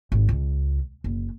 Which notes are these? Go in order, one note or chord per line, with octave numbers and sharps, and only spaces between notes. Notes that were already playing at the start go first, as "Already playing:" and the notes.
G#1
C#2
F#1